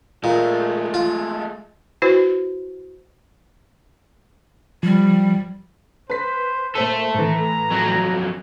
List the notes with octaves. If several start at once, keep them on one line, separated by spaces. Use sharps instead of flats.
A#2 G#3 A3
F4
E4 F#4 B4 C5
F3 G3
B4 C5 B6
A#2 A4 C5 E5 D#7
A2 E3 A#5
F2 F#3